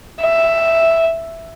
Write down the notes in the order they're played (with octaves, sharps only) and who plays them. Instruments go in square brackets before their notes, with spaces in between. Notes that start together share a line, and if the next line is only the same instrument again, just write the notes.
[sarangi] E5